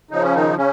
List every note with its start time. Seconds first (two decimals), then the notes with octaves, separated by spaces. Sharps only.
0.11 C#3 F3 D#4
0.23 C#4
0.34 D#3 D#4
0.57 C#3 C#4